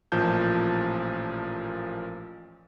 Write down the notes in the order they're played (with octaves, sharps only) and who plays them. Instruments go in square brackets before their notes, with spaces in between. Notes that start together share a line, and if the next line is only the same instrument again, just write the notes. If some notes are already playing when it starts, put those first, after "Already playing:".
[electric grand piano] A1 A#2 F3 A5 G6